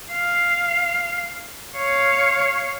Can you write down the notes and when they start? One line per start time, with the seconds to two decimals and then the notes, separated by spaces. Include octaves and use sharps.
0.12 F5
1.77 C#5 F5